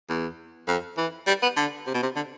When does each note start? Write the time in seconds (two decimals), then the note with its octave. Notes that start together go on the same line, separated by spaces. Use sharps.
0.09 E2
0.68 F2
0.97 E3
1.27 G3
1.42 B3
1.56 D3
1.86 C3
1.94 B2
2.03 C3
2.16 D3